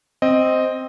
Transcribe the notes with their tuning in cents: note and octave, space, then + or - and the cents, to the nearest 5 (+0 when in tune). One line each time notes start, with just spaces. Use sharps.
C4 +0 D#5 +0